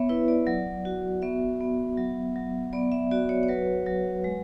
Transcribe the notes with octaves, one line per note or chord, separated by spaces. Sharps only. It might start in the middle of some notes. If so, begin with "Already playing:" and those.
Already playing: B3 C#5 E5
E4 B4
D5
F#3
F#4
B3 E5
B3
F#3
F#3
B3 D5
E5
F#4 D5
C#5
C#5
F#3 B4
F#3
G#3